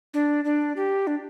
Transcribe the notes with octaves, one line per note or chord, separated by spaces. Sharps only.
D4
D4
G4
D4